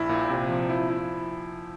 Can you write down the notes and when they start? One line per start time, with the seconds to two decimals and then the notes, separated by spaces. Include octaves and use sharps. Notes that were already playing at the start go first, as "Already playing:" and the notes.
Already playing: A#1 E4
0.09 A#2
0.30 C3
0.49 F3
0.69 E4
0.90 E4